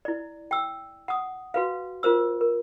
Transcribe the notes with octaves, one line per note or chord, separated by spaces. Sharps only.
E4 D5
G5 E6
F#5 D#6
F#4 B4 F5
F4 A#4 C5 E6
A#4